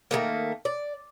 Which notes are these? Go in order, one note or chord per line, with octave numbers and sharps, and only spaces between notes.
D#3 F#3 A3 A#3
D5